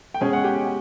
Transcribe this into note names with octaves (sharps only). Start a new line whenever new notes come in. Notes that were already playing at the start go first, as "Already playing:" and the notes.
G5
B2 G#3 C#4 G#4 G#5
F#5
G4 G5